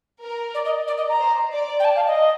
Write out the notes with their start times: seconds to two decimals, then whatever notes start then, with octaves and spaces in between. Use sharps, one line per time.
0.22 A#4
0.54 D5
0.65 D#5
0.87 D5
0.97 D#5
1.09 A#5
1.19 C5
1.52 D5
1.79 G5
1.84 A5
1.96 F5
2.06 D#5